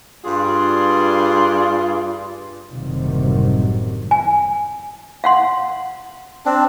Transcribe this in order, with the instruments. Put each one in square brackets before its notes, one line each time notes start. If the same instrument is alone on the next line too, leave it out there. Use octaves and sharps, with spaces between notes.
[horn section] G2 F4 G#4 D5 C6
[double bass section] F#1 A2 C3 D#3 F#3 G3
[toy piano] G#5
F5 F#5 C6
[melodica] C4 D4